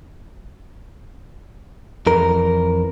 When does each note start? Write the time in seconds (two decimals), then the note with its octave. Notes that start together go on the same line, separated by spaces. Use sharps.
2.07 F2 E3 A#4